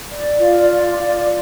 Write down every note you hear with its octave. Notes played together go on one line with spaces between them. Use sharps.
D5
F4
D5
F4